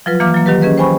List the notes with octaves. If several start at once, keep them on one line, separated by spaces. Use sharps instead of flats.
F3 F#3 F4 B4
E3 A#3 F5 D6 F6
F#3 A#3
D#3 F#3 G4 B4
C#4 G#4 B4 D#5
C5 G5 G#5 B5 C#6